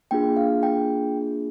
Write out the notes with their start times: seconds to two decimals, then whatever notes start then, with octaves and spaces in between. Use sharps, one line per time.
0.11 A#3 D4 F4 G#4 G5
0.37 F5
0.63 G5